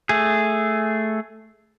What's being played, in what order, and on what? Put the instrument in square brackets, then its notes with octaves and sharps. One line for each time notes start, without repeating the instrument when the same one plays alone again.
[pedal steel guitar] A3 G#4